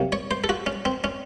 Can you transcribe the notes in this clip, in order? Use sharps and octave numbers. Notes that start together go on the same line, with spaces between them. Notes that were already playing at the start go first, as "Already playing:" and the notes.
Already playing: C3 F#3 A#3
C#5
C5
A4
F#4
C#4
C4
C#4